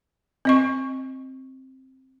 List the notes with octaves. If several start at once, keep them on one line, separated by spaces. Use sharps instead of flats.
C4 D#5 C#6